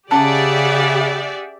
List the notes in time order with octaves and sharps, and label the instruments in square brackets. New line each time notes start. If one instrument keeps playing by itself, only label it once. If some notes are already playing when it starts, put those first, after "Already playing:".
[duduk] C#3 [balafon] C#4 A5 [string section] G4 D5 E5 [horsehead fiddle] G#4 F#5